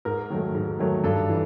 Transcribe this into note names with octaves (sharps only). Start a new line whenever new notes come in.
G#2 A#4
D#3 F#3 A3
G#2
D#3 F#3 A3
G2 A4
E3